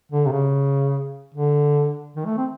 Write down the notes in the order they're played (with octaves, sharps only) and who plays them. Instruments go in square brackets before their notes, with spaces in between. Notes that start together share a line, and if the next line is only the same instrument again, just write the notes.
[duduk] D3
C3
C#3
D3
D#3
A3
C4